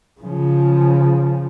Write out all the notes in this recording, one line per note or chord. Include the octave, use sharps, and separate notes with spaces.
C#3 F3